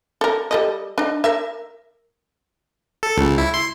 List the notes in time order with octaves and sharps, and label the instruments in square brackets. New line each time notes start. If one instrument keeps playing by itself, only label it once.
[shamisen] A4 A#4
G3 A4 D#5
D4 D#4
A#4 E5
[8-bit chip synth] A4
C#2
E4
C6